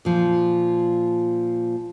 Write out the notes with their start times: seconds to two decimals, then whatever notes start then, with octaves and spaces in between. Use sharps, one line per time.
0.05 A#2 F3